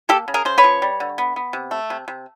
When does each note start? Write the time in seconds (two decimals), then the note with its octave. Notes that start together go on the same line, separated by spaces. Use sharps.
0.09 A#3 G4 A4
0.28 C#3
0.34 G#4 A#4
0.45 C#3 C5
0.58 B4 C#5
0.64 F3
0.82 G3
1.00 D3
1.18 B3
1.36 B3
1.53 C3
1.71 A3
1.90 C3
2.08 C3